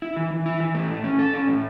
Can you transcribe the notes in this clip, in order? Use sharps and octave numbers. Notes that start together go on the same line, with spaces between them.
E4
E3
E3
E4
E3
A3
A2
C#4
A4
C#4
A2